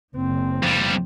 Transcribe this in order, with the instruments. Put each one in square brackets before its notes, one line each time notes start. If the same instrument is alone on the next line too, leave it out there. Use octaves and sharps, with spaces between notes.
[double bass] F#1 C4
[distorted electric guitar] F2 G3